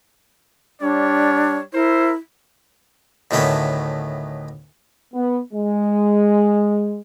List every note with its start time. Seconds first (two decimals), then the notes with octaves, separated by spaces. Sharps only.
0.81 G3 D4 C#5
1.74 E4 A#4 C5
3.31 D2 A2 D#3 A3 B3 C#4
5.14 B3
5.53 G#3